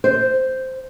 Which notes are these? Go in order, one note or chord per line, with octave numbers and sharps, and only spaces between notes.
C5